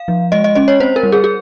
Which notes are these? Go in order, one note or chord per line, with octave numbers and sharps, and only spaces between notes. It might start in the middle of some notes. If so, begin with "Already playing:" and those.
Already playing: F5
F3
G#3 D#5
D#5
C#4 D#5
C#5
C4 C5
A#4
G3
G#4
G#4